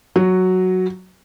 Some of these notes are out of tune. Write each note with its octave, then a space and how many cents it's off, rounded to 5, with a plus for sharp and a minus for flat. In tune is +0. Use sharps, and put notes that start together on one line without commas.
F#3 +0 F#4 +0